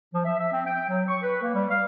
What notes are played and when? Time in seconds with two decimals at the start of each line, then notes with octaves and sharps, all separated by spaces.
0.14 F3
0.25 E5
0.38 E5
0.52 C4
0.66 G5
0.89 F#3
1.09 C#6
1.22 B4
1.42 A#3
1.54 G3
1.70 F5